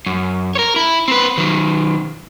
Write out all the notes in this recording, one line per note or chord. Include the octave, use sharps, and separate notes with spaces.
F#2
A#4 C#5
E4
C4 B4
D#3 F#3